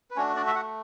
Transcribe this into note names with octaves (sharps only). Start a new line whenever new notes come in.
B4
A3 C#4 D4 F#4 C#5
D4 D5
E5
F#4 F#5